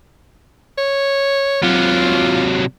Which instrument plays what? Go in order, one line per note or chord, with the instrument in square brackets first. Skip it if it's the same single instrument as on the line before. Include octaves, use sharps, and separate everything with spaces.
[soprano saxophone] C#5
[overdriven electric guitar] C3 F#3 [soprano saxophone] F4